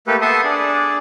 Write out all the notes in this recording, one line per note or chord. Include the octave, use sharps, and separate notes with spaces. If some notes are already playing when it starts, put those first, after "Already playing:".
A3 A#3 G4 A4 B4
B3 A4 E5 A5 C6 D#6
D4 G#4 D5